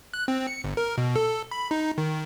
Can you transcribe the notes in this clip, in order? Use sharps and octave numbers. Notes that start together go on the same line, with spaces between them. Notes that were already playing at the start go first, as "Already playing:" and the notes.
F#6
C4
C#7
G1
A#4
B2
A4
B5
D#4
D#3